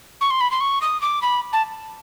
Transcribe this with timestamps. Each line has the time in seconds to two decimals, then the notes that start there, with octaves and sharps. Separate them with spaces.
0.21 C#6
0.30 C6
0.41 B5
0.51 C6
0.61 C#6
0.82 D#6
1.01 D6
1.22 B5
1.53 A5